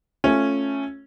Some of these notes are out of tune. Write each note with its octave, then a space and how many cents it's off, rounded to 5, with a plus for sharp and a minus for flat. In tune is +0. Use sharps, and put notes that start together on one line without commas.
A3 +0 C#4 -5 F4 +0